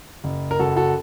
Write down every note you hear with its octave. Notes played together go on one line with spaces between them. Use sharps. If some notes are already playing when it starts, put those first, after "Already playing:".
F#1
A#4
F#1 F#4 A4
F#4 A4